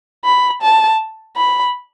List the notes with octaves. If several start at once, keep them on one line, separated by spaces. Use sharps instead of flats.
B5
A5
B5